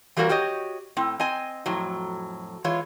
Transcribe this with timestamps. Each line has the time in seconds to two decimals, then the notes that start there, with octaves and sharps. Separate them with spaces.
0.17 E3 G3 A#3 F#4 A#4
0.29 F#4 G4 C#5 D#5
0.97 A2 C4
1.20 C4 D#5 G#5
1.66 F2 A2 F#3
2.64 E3 G#3 F4 C#5